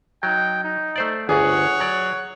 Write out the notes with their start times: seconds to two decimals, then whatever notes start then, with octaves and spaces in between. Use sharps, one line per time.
0.23 F#3 D#4 G5
0.63 D#4
0.96 A3 C5 D5
1.29 G1 D2 G#4 C#5 F#5
1.80 F#3 D5